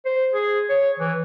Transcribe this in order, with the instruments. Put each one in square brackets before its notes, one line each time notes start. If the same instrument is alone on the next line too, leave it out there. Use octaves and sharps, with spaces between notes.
[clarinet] C5
G#4
C#5
E3